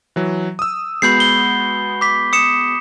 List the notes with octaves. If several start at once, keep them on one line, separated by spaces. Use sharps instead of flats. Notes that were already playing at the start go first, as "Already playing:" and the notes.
E3 F#3
D#6 E6
G#3 B3 F#4 B5 G6 C7
G7
D6 B6
D#6 C#7 E7